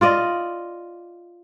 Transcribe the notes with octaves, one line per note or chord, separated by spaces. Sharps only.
F4 D5 D#5